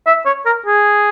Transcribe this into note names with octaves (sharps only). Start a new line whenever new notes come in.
E5
C#5
A#4
G#4